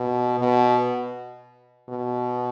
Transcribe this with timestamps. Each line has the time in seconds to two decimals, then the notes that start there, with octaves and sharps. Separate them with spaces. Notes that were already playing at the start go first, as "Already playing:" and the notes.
Already playing: B2
0.39 B2
1.89 B2